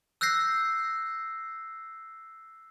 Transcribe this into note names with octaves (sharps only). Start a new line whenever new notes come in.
E6 F#6 G6 A#6 C7